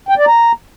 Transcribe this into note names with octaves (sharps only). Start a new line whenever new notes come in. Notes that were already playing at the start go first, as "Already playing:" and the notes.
G5
D5
A#5